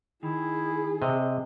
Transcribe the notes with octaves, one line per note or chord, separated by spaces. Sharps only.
D#3 E4 G#4
C3 D#5